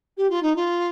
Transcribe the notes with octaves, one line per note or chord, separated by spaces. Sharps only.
G4
F4
D#4
F4